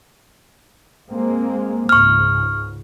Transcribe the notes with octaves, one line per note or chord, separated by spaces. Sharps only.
G#3 A#3 C4
C#2 G#2 C#6 F6